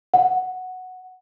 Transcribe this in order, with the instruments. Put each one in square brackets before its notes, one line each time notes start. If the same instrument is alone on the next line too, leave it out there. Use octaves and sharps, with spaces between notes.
[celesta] F#5